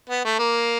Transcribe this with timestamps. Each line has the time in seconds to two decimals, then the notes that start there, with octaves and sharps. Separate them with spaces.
0.09 B3
0.25 A3
0.39 A#3